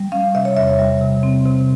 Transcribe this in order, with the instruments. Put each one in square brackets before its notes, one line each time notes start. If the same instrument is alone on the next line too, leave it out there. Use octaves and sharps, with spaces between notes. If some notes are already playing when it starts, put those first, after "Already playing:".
Already playing: [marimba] G3
C#4 F5
C3 E5
C#5
E2 E5
G3
C3
C4
C3